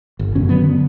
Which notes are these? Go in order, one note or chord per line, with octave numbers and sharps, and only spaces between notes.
G1
A1 F#2 B2 C#4
D3 F#3 B3
D3